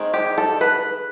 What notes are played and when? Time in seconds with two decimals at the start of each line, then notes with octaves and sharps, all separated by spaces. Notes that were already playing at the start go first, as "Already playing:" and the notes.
Already playing: D#3 G#3 C4 D#4
0.14 G4
0.38 A4
0.61 B4